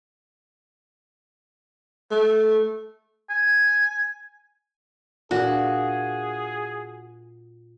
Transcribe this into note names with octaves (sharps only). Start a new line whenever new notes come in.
A3
G#5
A#2 D4 F#4 G#4